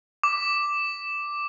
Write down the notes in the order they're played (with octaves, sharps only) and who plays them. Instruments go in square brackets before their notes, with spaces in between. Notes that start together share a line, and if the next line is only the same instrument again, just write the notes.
[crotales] D6